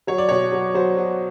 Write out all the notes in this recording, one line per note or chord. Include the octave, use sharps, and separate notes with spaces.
F#3 C#5
D5
B2 C#5
F#3
F#3 C5
F#3